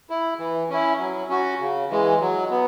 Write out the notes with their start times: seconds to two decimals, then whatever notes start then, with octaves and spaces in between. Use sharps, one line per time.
0.10 E4
0.39 E3
0.69 C#4 E4
0.99 F#3
1.29 C#4 F#4
1.60 C#3
1.90 E3 G#3
2.20 F#3
2.50 B3